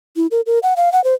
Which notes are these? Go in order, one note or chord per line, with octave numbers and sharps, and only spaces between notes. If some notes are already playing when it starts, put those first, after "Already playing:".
E4
A#4
A#4
F#5
F5
F#5
C5